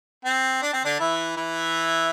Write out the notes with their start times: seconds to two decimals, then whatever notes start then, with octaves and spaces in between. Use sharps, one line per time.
0.25 C4
0.62 D4
0.73 C4
0.84 D3 D4
0.99 E3 E4
1.36 E3 E4